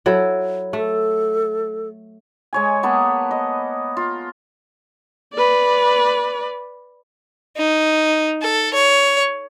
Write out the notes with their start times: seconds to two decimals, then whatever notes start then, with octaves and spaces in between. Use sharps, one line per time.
0.06 F#3 E4 A4
0.73 A3 A4
2.53 G#3 C#5 G#5
2.83 A#3 B3 B4 A5
3.31 D#5
3.97 F4
5.34 B4 D5
7.57 D#4
8.42 A4
8.74 C#5